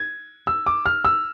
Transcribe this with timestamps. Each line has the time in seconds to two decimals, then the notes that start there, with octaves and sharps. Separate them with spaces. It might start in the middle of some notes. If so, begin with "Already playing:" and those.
Already playing: G#6
0.47 E6
0.66 D6
0.86 F6
1.05 E6